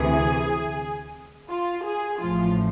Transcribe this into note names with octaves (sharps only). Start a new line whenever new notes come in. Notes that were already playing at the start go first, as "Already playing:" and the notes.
Already playing: D2 C3 E3 G#4
F4
G#4
A1 A2 F3 F4